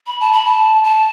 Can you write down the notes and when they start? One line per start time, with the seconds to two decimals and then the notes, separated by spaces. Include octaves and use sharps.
0.07 B5
0.20 A5
0.32 B5
0.45 A5
0.84 A5